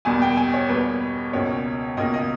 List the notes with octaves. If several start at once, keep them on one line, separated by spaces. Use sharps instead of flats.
E2 B2 G3 A#3 G#5
G5
G#5
C#5
E2 B2 G3 A#3 B4
C#2 B2 A#3 C#5
C#2 B2 A#3 D#5
D#5